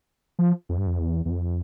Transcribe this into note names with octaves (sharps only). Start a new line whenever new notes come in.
F3
F2
G2
F2
E2
E2
F2